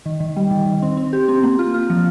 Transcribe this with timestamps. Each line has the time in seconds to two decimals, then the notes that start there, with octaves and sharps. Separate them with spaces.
0.06 D#3
0.20 D#3
0.36 G3
0.51 D#3
0.66 D#3
0.82 C4
0.97 C4
1.13 G4
1.28 C4
1.43 A#3
1.59 F4
1.74 F4
1.90 F3